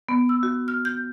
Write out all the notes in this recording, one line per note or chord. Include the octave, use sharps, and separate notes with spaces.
B3
E6
F#4
F6
G6